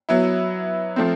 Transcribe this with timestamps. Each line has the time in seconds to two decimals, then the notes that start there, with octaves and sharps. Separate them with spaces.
0.09 F#3 B3 E4
0.96 F3 A3 C4